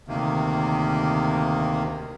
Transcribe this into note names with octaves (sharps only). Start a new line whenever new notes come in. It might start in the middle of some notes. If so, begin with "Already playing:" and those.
D2 C3 D#3 A#3